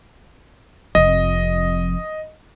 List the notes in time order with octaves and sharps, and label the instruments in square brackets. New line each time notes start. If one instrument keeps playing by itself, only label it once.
[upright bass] F1 F2 [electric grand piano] D#5